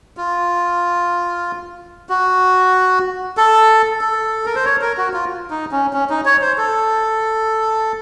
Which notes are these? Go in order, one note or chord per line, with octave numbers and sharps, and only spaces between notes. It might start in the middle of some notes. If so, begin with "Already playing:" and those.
F4
F#4
A4
A4
A#4
C5
C#5
A#4
F#4
F4
D#4
C#4
C#4
D#4
C#5
C5
A4